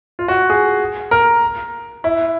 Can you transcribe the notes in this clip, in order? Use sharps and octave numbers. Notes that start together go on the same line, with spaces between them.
F4
F#4
G#4
A#4
E4